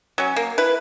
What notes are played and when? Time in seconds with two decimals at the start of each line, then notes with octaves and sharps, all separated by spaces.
0.18 F#3 C#4
0.36 A#3
0.58 E4 B4